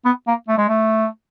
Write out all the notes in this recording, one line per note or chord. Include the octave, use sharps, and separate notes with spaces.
B3
A#3
A3
G#3
A3